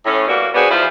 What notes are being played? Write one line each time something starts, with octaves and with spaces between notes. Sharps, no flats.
A2 C#4
B2 G3 A#3 F#4
B3 D4 F#4 G#4 C5
E2 F3 E4 F4 C5